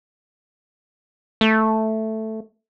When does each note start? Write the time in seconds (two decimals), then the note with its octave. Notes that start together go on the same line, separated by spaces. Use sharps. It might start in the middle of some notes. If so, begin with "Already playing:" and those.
1.41 A3